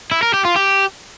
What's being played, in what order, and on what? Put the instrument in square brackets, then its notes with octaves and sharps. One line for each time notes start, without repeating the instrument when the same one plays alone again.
[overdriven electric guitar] E4
A#4
G4
F4
G4